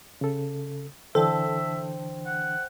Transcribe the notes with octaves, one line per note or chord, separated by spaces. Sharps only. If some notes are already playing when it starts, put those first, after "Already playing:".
C#3 A4
D3 E3 D4 A4 C5 E5 G5
F#5